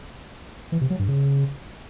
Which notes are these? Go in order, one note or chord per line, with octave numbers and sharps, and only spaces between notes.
E3
C3
F#3
G2
C#3